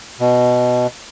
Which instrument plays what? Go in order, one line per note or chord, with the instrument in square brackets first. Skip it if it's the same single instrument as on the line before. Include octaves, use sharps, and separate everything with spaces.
[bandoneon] B2